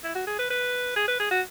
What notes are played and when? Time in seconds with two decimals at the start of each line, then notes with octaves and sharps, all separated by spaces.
0.04 E4
0.15 F#4
0.27 G#4
0.39 B4
0.50 B4
0.96 G#4
1.08 B4
1.20 G#4
1.31 F#4